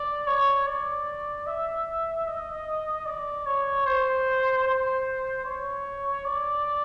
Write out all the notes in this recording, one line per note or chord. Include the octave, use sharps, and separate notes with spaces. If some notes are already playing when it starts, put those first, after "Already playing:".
Already playing: D5
C#5
D5
E5
D#5
D5
C#5
C5
C5
C#5
D5